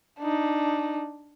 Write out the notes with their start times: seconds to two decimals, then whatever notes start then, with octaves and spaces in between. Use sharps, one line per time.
0.20 D4 D#4